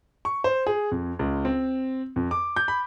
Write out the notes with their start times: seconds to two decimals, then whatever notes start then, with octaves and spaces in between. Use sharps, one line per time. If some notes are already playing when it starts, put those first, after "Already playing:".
0.25 C#6
0.44 C5
0.67 G#4
0.91 F2
1.19 C#2
1.45 C4
2.16 F2
2.31 D6
2.56 G6
2.68 B5